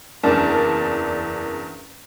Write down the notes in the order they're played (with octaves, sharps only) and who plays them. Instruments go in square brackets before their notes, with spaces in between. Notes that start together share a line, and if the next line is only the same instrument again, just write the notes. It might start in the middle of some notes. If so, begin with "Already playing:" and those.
[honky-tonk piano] F#1 E2 D4 A#4 A5